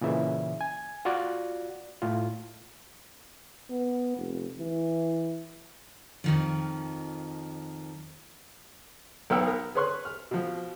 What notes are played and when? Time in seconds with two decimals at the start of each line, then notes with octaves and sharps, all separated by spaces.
0.01 A#2 C#3 E3 E5
0.61 G#5
1.05 F4 F#4 D5
2.02 A2 F4
3.70 B3
4.17 F1
4.59 E3
6.24 F2 D#3 F3
9.30 B1 B3 F#5 G5 E6
9.47 A#4
9.75 G#4 B4 C#5 C6 C#6 F#6
10.05 F6
10.31 B2 F3